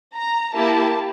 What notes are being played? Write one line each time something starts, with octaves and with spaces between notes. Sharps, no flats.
A#5
A#3 E4 G4 A5